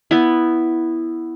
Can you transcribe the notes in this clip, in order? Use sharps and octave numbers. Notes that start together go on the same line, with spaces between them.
B3 E4